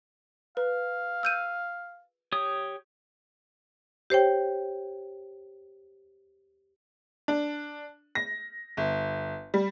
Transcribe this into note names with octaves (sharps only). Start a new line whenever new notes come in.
B4 F5
E6 G6 D#7
G4 C#5 D#6
G4 C5 C#5 G5
D4
A#6
G1
G3